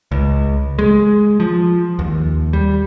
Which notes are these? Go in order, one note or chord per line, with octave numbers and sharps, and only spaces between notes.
C#2
G#3
F3
D#2
G3